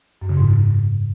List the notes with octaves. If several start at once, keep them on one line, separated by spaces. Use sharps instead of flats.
F#2
C#3
G#2